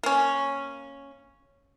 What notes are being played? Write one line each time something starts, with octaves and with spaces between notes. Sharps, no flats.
A#3 C#4